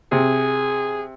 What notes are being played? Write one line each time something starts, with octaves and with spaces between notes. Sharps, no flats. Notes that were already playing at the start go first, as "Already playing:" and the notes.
C3 G#4